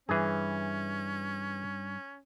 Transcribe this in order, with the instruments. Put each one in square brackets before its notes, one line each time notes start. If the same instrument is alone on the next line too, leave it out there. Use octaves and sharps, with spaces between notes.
[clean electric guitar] G2 [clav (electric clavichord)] E3 G#4 [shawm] C#4